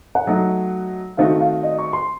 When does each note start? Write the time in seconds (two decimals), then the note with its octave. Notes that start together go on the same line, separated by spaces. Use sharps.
0.15 F#5
0.27 F#3 A3 D#4 F#4
1.17 D#3 A3 C4 D#4 F#4 F5
1.41 F5
1.63 D#5
1.79 C#6
1.93 C6